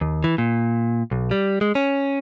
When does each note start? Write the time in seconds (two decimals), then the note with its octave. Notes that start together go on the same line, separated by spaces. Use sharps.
0.01 D#2
0.24 E3
0.38 A#2
1.11 B1
1.31 G3
1.61 G#3
1.75 C#4